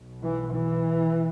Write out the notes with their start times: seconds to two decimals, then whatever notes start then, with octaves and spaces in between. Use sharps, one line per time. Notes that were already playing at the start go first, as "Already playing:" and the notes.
Already playing: B1 B2
0.22 E3
0.52 E3